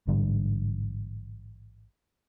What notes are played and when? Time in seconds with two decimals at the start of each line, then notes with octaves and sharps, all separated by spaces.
0.07 A1 G#2 D3 G3